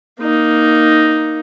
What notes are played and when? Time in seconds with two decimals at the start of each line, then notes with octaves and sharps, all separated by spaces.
0.21 A#3 D#4